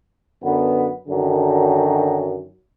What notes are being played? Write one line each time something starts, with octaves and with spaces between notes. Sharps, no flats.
F#2 D3 B3
F#2 D3 D#3 F#3